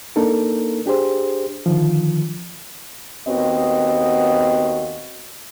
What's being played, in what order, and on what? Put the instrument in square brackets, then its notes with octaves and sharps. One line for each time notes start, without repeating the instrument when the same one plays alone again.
[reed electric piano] A#3 D4 D#4 A4 A#4
D4 G4 G#4 C5
D3 D#3 F3
[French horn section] D#2 B3 C4 F#4 D#5